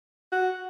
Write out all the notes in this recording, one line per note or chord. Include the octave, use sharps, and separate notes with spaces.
F#4